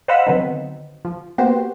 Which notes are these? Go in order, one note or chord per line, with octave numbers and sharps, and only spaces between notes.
C5 D#5 F5 F#5 B5 E6
D3 D#3 F#3 B3 C4 D#4
F3
A#3 B3 F#4 G4 C5